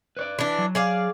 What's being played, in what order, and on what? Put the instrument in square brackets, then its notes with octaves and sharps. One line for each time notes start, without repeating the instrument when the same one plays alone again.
[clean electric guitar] B4 C#5 D5
[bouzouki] E3 D4
[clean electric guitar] F#3
[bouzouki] G#4 D5 F5